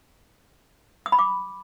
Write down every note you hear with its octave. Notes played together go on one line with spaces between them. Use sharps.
D#6
B5
D6